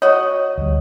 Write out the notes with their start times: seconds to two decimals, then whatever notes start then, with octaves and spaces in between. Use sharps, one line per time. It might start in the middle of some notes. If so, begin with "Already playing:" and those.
0.02 F#4 C#5 D#5
0.58 D2 G3